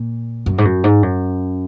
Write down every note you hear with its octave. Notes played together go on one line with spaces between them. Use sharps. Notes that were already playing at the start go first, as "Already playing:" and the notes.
Already playing: A#2
F#2
G#2
F#2
G#2
F#2